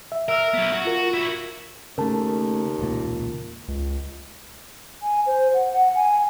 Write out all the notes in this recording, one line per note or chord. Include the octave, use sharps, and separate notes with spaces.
E5
A#4 E5 E6 F6
F#3 B3
F#4
F4 A#4
E4 F#4
D#2 C#3 A3 A#4 A5
E1 C#2 A#2
C#2
G#5
C5
F#5
F#5
G#5